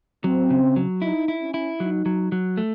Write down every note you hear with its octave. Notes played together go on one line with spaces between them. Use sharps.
F#3 C4
C#3
F#3
D#4 E4
E4
C#4
E4
F#3 D#4
F#3
F#3
A3